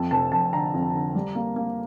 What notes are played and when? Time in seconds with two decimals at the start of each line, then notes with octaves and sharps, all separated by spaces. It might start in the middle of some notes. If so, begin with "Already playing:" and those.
Already playing: F2 A5
0.11 F1 A5
0.32 F1 A5
0.53 D3 A#5
0.74 F2
0.94 D3
1.15 G3
1.35 A#3
1.56 A#3